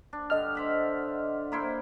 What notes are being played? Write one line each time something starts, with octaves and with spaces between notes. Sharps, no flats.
D4
G2 D3 D#5 F6
C5 E5 F#5
A#3 E4 C5